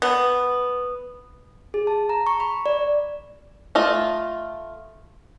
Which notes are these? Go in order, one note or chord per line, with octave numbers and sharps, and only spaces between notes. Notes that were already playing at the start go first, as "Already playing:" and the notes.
B3
G#4
A5
A#5
C#6
B5
D5
A3 F4 D#5